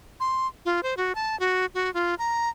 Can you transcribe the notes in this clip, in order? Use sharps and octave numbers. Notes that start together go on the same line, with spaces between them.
C6
F4
C5
F#4
A5
F#4
F#4
F4
A#5